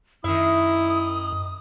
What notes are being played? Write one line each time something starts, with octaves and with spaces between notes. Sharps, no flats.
F#2 D#3 E4 E5 D#6